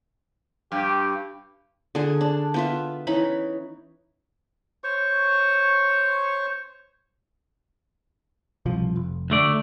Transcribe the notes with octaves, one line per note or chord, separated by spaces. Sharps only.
G2 G4
D3 G#4
D4
B3 F4 E5
E3 C#4 D#4 B5
C5 C#5 C#6
E1 C2 F3
F1
D2 A3 D5